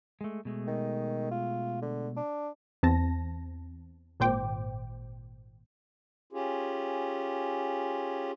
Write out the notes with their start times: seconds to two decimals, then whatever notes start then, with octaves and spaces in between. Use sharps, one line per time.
0.21 G#3 A3
0.45 B2 G#3 A3
0.67 D#3
1.31 F4
1.82 D3
2.17 D4
2.83 E2 C4 A5 A#6
4.20 G#1 A#2 C5 G5 D6
6.33 C#4 F4 G4 G#4